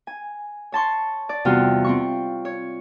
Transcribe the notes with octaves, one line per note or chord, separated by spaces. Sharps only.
G#5
C#5 A5 C6 C#6
D5
E2 C3 G3 F4 F#4 F6
C4 F4 C#6
C#5